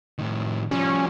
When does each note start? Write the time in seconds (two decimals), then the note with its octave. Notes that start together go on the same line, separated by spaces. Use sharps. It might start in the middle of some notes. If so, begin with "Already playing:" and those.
0.19 A2 D#3
0.71 F3 G3 C#4